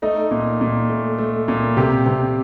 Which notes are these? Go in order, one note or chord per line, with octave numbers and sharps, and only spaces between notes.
A3 D#4
A#2
A#2
A3
A3
A#2
C3 G4
C3